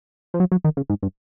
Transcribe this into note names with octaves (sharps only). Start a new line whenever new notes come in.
F3
F#3
F#3
D#3
C#3
G#2
G2